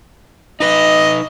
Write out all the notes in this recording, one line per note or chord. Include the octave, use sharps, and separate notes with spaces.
D#4 B4 D#5